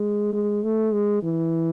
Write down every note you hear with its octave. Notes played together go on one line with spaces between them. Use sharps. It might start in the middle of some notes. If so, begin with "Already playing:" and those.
Already playing: G#3
G#3
A3
G#3
E3